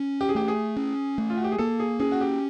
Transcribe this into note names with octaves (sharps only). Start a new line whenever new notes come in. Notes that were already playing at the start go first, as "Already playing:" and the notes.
Already playing: C#4
G4
G#4
A3 G4
G#4
C#4
A3
F4
F#4
G4
G#4
A#3 A4
G#4
C#4 G#4
F#4
G4